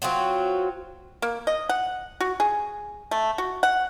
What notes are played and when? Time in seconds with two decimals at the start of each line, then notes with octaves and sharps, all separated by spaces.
0.02 F#3 C4 F4 F#4
1.22 A#3
1.47 D#5
1.69 F#5
2.20 F#4
2.40 G#4
3.11 A3
3.38 F#4
3.63 F#5